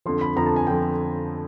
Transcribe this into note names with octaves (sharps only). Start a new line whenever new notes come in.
F2 D3 F3 C6
B5
F2 D3 F3 A#5
A5
G#5
D3 F3 G5